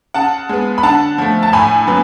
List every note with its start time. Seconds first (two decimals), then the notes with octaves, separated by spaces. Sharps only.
0.14 C#3 F#5 A5
0.49 G#3 B3
0.78 B5
0.83 D3 F#5 A5
1.18 F3 A3
1.43 A5
1.53 A2 G#5 B5
1.87 F#3 B3